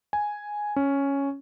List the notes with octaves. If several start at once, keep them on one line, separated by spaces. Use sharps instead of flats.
G#5
C#4